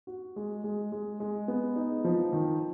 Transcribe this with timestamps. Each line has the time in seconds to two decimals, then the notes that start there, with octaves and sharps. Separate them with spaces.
0.07 F#4
0.36 G#3
0.64 G#3
0.92 G#3
1.20 G#3
1.48 B3
1.76 D#4
2.05 F3
2.33 D#3